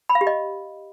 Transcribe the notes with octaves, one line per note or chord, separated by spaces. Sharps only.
B5
F5
G4
D#5